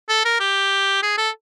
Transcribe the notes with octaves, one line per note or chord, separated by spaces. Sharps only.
A4
A#4
G4
G#4
A4